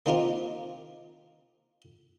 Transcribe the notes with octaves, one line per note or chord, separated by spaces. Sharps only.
A#3 C4 D#4 F4 G4 A#4